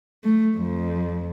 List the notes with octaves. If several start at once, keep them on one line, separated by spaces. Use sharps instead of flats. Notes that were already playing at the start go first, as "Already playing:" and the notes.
A3
F2